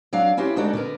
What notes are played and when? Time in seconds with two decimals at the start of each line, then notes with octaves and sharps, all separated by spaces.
0.13 F#3 D4 F5
0.37 C#4 E4 F#4 G4 C5
0.56 D2 G#3 D4 D#4 F#4 A4
0.73 D3 B3 A#4